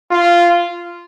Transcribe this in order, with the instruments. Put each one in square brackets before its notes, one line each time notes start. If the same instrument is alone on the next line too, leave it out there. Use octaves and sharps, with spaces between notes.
[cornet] F4